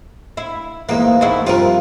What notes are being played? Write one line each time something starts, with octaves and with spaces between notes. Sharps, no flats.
E4
E2 G#2 E3 A#3
D#2 B3 E4
G2 C3 F3 F4 A#4